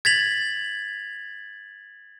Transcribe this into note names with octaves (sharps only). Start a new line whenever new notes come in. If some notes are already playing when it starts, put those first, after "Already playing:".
G#6 A6 B6 F7 F#7